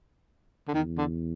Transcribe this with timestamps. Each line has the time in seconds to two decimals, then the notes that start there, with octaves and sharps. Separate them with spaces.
0.68 D3
0.74 E2 D#3
0.98 D3